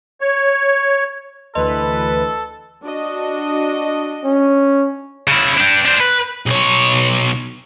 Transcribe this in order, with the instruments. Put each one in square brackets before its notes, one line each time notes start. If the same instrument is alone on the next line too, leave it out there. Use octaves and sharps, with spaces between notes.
[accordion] C#5
[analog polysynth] D2 E3 B4 [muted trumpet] A4 [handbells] D#5 C6
[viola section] D4 F#4 D#5
[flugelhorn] C#4
[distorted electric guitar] C#3 E4
D4 G4
D4 C5
B4
B1 C#5